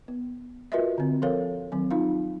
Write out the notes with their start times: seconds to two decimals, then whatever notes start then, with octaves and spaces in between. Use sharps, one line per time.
0.08 B3
0.72 F4 F#4 A#4 B4 D#5 E5
0.98 D3 C4
1.22 F3 A4 A#4 C#5 F5
1.72 D#3 F#3 C4
1.91 D#4 F4 F5